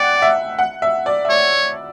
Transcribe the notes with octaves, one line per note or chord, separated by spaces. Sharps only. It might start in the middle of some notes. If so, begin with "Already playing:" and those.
Already playing: D5 F#5 G5
E5
F#5
E5
D5
E5
C#5 D5